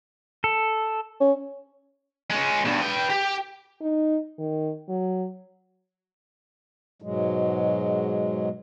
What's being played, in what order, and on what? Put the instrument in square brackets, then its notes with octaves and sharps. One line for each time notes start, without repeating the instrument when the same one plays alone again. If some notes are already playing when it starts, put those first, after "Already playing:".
[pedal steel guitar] A4
[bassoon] C#4
[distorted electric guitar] G#3 C#4
G2 B2
B4 G5
G4
[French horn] D#4
D#3
F#3
[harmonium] G#2 B2 F#3 G#3